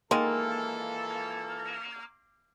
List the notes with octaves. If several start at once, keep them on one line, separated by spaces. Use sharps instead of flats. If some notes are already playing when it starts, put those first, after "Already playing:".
D#3 E3 G#3 A#3 F4 A4